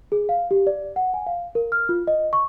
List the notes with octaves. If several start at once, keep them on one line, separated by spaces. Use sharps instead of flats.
G#4
F5
G4
D5
F#5
G#5
F5
A#4
F6
F4
D#5
C#6